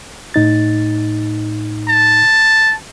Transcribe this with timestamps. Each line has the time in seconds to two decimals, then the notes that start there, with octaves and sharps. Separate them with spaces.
0.34 A2 D#4 A6
1.89 A5